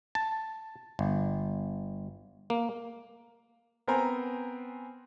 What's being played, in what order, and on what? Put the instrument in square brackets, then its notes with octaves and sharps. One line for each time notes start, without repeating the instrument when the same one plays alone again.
[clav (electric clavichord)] A5
G1
A#3
[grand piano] B3 C4 A#4 C5 G#5 A#5